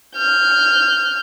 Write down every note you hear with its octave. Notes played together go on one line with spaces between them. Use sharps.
F6 G6